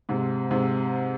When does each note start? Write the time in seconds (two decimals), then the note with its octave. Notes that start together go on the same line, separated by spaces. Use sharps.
0.09 G#2 C3
0.51 G#2 C3